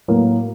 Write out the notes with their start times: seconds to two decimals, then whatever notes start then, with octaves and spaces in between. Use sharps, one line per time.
0.08 A2 F#3 A#3